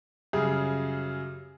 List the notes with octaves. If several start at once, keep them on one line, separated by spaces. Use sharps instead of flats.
F#2 C#3 G3 G#4